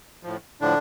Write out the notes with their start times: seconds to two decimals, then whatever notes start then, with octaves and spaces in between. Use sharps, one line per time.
0.23 A2 F3
0.61 A2 D3 F3 D4